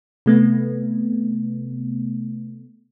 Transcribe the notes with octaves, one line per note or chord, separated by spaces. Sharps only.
C3 A3 B3